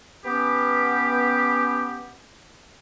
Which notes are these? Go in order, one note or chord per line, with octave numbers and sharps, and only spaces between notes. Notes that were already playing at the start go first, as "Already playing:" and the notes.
B3 C#4 G4